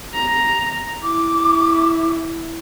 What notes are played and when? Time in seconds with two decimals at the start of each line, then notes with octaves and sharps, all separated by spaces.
0.14 A#5
1.03 E4 D6